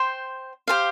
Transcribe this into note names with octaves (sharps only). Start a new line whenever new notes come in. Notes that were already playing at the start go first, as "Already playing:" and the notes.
Already playing: C5 G5 C6
G4 C5 F5